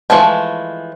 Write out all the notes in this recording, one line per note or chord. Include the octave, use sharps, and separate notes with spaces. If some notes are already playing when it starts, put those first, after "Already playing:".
E3 F3 G#3 A3